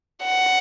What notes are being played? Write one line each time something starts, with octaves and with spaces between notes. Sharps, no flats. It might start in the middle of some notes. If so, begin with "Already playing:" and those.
F#5